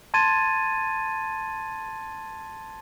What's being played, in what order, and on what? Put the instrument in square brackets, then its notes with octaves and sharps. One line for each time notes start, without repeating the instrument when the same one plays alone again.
[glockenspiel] A5 C6 G#6 A6 D#7